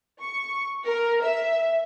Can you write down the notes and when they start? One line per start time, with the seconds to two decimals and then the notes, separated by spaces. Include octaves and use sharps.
0.21 C#6
0.86 A#4
1.23 E5